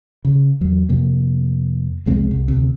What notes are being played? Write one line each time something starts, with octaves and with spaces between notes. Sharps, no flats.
C#3
E2 F#3
F2 C3 A#3
C2 F2 G#3 C4
C2
D2 C3